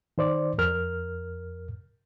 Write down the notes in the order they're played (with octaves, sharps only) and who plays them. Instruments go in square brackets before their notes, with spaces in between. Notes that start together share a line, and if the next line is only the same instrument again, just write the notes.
[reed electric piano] D#3 C5 D5
F2 A#4 F6